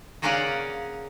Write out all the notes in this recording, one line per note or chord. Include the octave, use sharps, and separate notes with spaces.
C#3 A#3 C#4 D5 F5 F#5